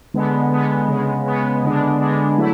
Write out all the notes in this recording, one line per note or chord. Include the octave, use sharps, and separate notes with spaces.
D3 G#3 B3
D3 G#3 B3
C#3 G#3 B3
C#3 G#3 B3
D3 G#3 B3 D4
D3 G#3 B3 D4
F#3 A3 E4